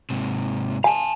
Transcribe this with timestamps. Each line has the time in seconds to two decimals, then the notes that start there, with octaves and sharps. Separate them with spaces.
0.10 G#2 C3
0.84 F5 G#5 A5